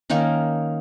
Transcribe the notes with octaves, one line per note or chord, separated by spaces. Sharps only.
D#3 A#3 C#4 D#4